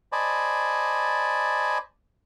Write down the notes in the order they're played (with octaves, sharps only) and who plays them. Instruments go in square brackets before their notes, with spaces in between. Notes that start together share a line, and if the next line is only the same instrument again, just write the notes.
[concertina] C5 D5 D#5 G#5 A5 B5